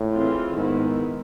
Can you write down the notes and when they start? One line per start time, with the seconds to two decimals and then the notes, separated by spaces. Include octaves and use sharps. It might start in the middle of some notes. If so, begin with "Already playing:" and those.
Already playing: A2
0.15 E3 G#3 C4 F4
0.56 G#2 D#3 G#3 B3 E4